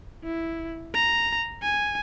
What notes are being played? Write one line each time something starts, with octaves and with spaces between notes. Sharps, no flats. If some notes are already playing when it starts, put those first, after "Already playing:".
E4
A#5
G#5